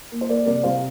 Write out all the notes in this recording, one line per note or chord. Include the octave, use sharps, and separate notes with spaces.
A#3
C5
A#3 A#4 D5
C3 A#4 D5
C3 C5 F5